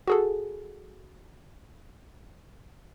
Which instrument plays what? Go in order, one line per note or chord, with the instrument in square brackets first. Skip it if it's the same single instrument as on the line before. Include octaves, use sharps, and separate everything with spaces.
[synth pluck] F#4 G#4 A4